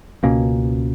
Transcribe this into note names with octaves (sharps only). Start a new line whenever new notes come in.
C#2 B2 A#3 C#4